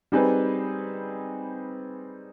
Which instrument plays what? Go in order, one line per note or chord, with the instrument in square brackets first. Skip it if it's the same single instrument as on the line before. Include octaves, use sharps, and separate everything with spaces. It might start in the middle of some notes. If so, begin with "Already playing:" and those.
[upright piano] G3 C4 D#4 G#4 B4